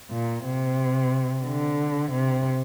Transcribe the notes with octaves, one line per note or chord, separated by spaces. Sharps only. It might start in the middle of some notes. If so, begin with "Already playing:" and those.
A#2
C3
D3
C3